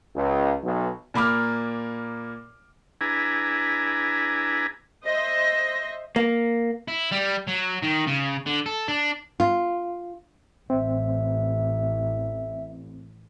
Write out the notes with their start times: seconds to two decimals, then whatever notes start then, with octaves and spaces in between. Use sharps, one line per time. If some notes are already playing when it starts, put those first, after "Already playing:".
0.15 C#2
0.64 B1
1.14 A#2 A#3 B5 D6 F6
3.01 D4 E4 G#4 B4 G#5 A#5
5.05 C5 D#5 E5 A#6
6.16 A#3
6.88 E4
7.11 G3
7.47 F#3
7.82 D#3
8.07 C#3
8.46 D3
8.66 A4
8.88 D4
9.40 F4
10.70 A1 C4 E5